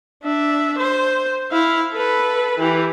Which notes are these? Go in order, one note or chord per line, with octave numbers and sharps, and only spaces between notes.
D4 E5
C5
E4 F5
A4 B4
E3 G4